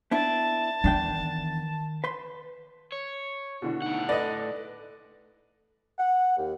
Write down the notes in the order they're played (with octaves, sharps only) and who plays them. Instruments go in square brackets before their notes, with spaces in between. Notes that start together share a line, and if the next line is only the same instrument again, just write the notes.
[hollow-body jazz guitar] B3 D4 E4 [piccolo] A5
[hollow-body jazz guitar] E2 D4 G5 [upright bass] D#3
[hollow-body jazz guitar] B4 C6
[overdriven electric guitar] C#5
[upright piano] B2 D3 F#4 [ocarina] E4
[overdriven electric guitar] A2 F#5 [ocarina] D#4
[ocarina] A4 [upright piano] B4 A#6 [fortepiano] D5 D#5
[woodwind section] F#5
D#2